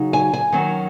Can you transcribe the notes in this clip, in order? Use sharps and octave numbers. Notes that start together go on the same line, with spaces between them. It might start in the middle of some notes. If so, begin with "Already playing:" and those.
Already playing: C#3 F#3 D#4
G#5
G#5
D#3 F#3 C#4